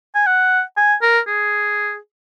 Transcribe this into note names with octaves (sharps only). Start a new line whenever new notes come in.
G#5
F#5
G#5
A#4
G#4